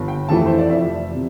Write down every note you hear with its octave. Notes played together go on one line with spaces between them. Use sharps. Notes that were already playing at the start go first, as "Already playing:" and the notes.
Already playing: G1
G5
F2 E3 A3 E4 A5
C5
D5
F1 E5
C3